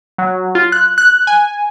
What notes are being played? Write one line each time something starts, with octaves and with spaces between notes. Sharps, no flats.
F#3
F4
F#6
F#6
G#5